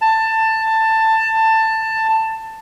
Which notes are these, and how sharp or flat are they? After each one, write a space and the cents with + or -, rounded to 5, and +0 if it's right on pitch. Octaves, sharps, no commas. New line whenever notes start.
A5 +15